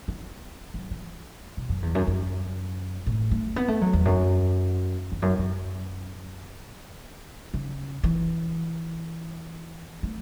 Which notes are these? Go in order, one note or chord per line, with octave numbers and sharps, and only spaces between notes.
B3
F#3
E3
B2
F#2
E2
F#2
F#2
A2
A3
B3
A3
F#3
E2
F#2
E2
F#2
F#2
C#3
E3
A3